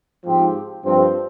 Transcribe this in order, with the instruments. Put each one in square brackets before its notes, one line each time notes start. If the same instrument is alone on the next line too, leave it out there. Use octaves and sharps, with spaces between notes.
[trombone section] G#2 F3 C4 G4
G2 F3 C4